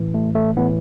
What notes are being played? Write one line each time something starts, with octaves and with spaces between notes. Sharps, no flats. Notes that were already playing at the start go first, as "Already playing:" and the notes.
Already playing: A2 E3
A3
A3
A2 E3 B3